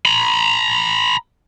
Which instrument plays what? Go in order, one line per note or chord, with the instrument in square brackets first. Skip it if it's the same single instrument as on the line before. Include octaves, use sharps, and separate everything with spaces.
[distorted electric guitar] A#5 B5